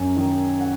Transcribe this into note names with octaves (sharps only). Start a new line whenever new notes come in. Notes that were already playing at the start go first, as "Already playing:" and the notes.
Already playing: F#2 G#5
D#3
F#5